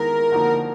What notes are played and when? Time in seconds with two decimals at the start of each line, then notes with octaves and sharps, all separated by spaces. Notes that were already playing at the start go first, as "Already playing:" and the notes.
Already playing: D#3 G#3 B3 E4 A#4
0.32 D3 F3 A#3 D#4 F#4